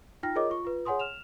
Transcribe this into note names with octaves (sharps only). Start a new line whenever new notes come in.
D#4 F4 G5 F6 A#6
F4 G#4 A#4 C#5 D#5 D6
F4 C#6
F4 B4
G#4 C#5 F#5 G#5 C6 D#6
F6 E7 F7